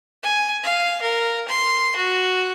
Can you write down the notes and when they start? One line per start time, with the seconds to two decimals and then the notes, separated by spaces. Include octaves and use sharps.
0.23 G#5
0.64 F5
1.02 A#4
1.49 C6
1.96 F#4